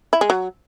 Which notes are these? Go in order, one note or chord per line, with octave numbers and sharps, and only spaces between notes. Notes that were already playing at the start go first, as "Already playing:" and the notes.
E4
G#3
F#3